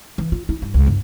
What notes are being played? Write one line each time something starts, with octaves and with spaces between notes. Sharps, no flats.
E3
F4
E4
G2
C#2
G1